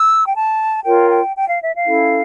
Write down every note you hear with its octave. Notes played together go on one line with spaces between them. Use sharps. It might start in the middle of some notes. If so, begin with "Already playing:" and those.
Already playing: E6
G5
A5
F4 A#4 C#5 G5
G5
G5
F5
E5
F5
C#4 E4 A4